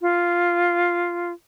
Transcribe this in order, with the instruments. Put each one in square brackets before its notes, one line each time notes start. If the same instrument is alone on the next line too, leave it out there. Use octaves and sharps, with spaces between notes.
[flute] F4